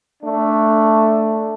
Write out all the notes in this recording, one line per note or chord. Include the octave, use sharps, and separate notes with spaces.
A3 D4